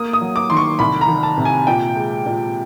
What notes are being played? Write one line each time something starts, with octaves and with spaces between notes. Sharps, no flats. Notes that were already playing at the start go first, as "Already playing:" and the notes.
Already playing: A#3 D#6
D#6
F#3
D6
D#3 C6
C#6
C2 B5
A#5
D#3
A5
C3
G#5
A#2 G5
G#3
A#2